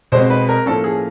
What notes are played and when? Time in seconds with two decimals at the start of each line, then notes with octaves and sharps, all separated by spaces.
0.12 B2 G#3 C4 C5
0.30 B4
0.49 A#4
0.66 A2 F3 A#3 C#4 A4
0.84 G#4